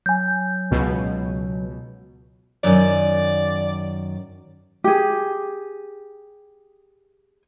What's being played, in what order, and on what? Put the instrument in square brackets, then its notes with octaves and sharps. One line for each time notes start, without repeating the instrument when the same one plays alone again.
[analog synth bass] F#3 [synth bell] G#5 G6
[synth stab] C#2 B2
[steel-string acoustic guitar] F#2 D#3 [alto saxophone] D5
[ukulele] G4 G#4